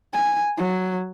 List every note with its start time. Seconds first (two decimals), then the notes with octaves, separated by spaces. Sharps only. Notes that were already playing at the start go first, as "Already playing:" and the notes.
0.13 G#5
0.58 F#3